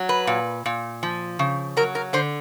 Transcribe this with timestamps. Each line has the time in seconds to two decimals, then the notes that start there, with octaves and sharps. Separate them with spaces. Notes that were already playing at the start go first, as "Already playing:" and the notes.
Already playing: F#3
0.09 B4
0.27 A#2
0.66 A#2
1.03 F3
1.39 C#3
1.77 F#3 A#4
1.95 A#4
2.13 D3 C5